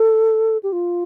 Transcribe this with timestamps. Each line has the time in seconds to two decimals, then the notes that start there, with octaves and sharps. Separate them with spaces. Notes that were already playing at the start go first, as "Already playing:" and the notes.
Already playing: A4
0.63 G4
0.72 F4